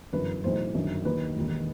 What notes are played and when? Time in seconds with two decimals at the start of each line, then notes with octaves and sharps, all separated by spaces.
0.13 G1 F#2 E3 B4
0.44 B1 A2 E3 C5
0.74 G1 F#2 D#3
1.05 D#2 D#3 B4
1.36 E1 D#2 D#3